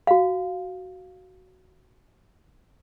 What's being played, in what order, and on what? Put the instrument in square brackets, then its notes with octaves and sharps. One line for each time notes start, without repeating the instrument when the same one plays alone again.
[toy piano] F#4 F5